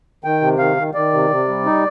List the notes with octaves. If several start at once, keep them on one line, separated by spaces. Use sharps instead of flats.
D#3 G5
C3
D#3 F5
D#3
D#3 D5
C3
C3
G3
D#4